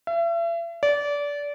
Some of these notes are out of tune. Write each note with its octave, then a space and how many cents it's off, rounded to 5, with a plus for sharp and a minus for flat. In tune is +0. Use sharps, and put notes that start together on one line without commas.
E5 +40
D5 -25